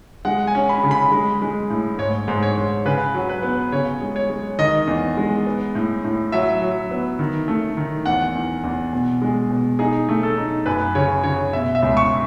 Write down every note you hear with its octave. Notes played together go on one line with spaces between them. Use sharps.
G#3 F#5
G#5
C#4
B5
C#3
B5
G#3
G#3
A2
G#2 C#5
G#2
C#5
G#2
C#3 B4
F#3
B4
B3
C#3 C#5
G#3
C#5
G#3
D#3 D#5
E2
G#3
B3
A2
A2
F#3 E5
F#3
B3
D#3
A3
D#3
E2 F#5
E2
E2
B2
G#3
B2
D#4 G#4
A3
A4
D#4
F#2 B4
C#3 C#5
C#3 C#5
B2 E5
E5
C#2
C#6